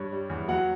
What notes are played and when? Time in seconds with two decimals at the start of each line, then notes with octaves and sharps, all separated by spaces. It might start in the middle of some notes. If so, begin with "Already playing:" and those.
Already playing: G2 C#5
0.12 G3
0.30 E2
0.48 F#3 F#5